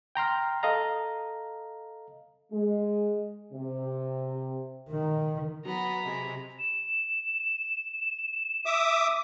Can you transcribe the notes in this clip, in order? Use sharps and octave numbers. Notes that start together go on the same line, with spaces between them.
G5 A#5 C6 F6
A4 D#5 F5 A#5
G#3
C3
D#3
F#3 B3 A#5 B5
C3 G#3
E7
E5 D6 D#6